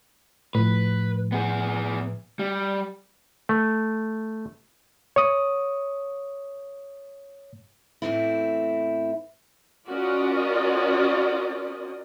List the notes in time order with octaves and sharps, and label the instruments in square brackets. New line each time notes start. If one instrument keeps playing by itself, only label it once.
[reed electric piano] A2 F3 [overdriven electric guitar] B4
[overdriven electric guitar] B3 G#4
G3
[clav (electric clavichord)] A3
[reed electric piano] C#5 D#6
[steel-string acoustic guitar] E2 A2 E3 A3 C4 E4
[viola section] C#4 F4 F#4 A#4 D5 D#5